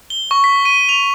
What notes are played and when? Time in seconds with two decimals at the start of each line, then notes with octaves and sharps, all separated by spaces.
0.10 G7
0.31 C#6
0.44 B6
0.65 D#7
0.89 F7